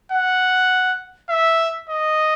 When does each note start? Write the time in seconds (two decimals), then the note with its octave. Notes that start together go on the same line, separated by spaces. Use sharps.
0.12 F#5
1.29 E5
1.89 D#5